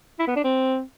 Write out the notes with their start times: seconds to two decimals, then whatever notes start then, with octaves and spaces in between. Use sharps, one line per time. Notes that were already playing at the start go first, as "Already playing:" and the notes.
0.19 E4
0.27 B3
0.36 D4
0.44 C4